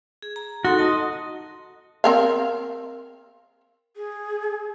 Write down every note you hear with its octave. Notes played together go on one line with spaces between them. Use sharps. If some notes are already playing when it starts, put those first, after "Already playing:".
G#4
A#5
D#4 F#4 A4 C6
D#5 A5
C4 A#4 F5
G#4